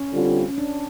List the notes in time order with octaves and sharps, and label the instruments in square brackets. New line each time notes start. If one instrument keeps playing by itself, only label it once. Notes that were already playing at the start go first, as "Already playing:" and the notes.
Already playing: [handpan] C#4
[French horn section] D3 G3 C4 F4
[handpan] C#4
D4